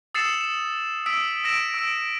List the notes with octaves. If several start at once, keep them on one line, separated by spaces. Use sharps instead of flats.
D#6 E6 A6 C7 C#7 E7
E7
D#6 E6 B6 D7
E6 A#6 D7 E7
E6 D7